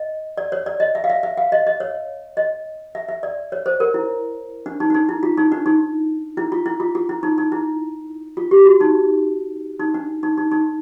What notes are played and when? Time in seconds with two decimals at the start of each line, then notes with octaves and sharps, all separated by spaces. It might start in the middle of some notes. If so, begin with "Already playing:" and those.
Already playing: D#5
0.37 D5
0.52 C#5
0.66 D5
0.80 D#5
0.95 E5
1.04 F5
1.10 E5
1.23 E5
1.37 F5
1.52 D#5
1.67 D#5
1.80 C#5
2.37 D#5
2.95 E5
3.08 E5
3.23 D5
3.52 C#5
3.66 C5
3.80 A#4
3.94 E4
4.66 D4
4.80 D#4
4.90 D4
4.95 D#4
5.09 E4
5.23 F4
5.37 D#4
5.52 D4
5.66 D#4
6.37 E4
6.52 F4
6.66 E4
6.80 F4
6.95 F4
7.09 E4
7.23 D#4
7.38 D#4
7.52 E4
8.37 F4
8.51 G4
8.66 F#4
8.81 D#4
9.80 D#4
9.94 D4
10.23 D#4
10.38 D#4
10.51 D#4